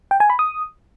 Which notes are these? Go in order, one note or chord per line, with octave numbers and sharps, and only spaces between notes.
G5
G#5
B5
D#6